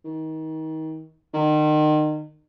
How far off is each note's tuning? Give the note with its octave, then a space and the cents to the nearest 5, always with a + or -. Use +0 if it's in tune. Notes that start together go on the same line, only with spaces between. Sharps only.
D#3 +30
D#3 -35